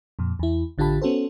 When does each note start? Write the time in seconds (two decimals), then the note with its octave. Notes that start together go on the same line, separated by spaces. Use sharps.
0.19 F2 A#2
0.39 E2 E4
0.78 A1 D3 F4 G4 A5 B5
1.02 B3 C#4 F#4 A4 C5